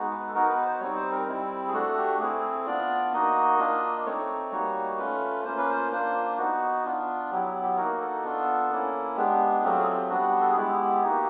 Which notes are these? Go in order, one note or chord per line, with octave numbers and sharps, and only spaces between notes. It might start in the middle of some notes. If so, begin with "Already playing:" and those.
Already playing: G#3 B3 D#4 F#4
B4
A4
B3 D#4 F#4 A#4
B4
C5
G3 C4 D#4 C#5
C5
A#4
G3 C4 E4
G#4
A3 D4 F#4 A4
G4
A3 C4 E4 G#4
B3 D4 F4 D5
A#3 D#4 F#4 D#5
A#3 D4 F4
A3 C4 D#4 C#5
G3 A#3 D#4 F#4
A3 C#4 F4 B4
A#3 C#4 F4 C5
B4
C5
A#3 D4 F4 C5
B3 D#4 F#4
B3 D4 F4
F#3 B3 E4 G4
G4
G4
A#3 D#4 F#4 A#4
A4
B3 D4 F4
A#3 C#4 E4
G#3 B3 D4 G4
G#4
F#3 A3 C4 F4 G4
G#4
G4
G3 B3 D4 F#4
A4
G#4
G#3 B3 E4 G4
A#3 D#4 F#4